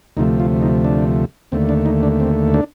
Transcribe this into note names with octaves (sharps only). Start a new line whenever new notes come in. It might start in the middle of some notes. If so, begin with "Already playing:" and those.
D2 C3 F3 A3 D#4
F4
D#4
D4
D#2 D3 A3 C4
D4
D#4
D4
C4
D4